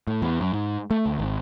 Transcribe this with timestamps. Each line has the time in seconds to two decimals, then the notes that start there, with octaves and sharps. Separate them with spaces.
0.07 A2
0.22 E2
0.41 F#2
0.53 G#2
0.91 A3
1.06 D2
1.19 G#1